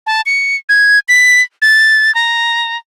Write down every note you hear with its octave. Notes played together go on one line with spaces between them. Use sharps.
A5
C#7
G#6
B6
A6
A#5